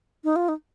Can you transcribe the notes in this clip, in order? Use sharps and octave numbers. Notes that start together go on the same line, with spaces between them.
D#4
F4
D#4